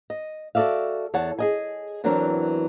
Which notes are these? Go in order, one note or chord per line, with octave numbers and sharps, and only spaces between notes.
D#5
F#4 A4 A#4 D5 E5 F5
E2 C#5 F#5 A5
G#4 D#5 G#5
E2 E3 F#3 C4 D4 A#4